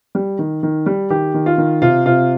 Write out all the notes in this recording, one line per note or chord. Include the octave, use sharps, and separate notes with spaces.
G3
D#3
D#3
G3
D#3 G4
D#3
F4
D#3
C3 F4
C3 F4